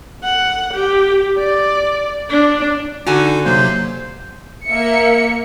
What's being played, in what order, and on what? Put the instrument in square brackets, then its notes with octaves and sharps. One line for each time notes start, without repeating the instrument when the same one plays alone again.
[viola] F#5
G4
D5
D4
[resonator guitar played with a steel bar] D3 F#4 G#5 [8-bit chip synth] D#4 A4
[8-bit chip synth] C3 F#3 A#3 [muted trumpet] C5
[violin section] A#3 E5 C#7